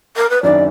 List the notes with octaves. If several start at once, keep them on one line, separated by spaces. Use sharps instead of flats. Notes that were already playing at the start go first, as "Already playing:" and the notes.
A#4
B4
F#1 F#2 D#3 F#3 D4 D5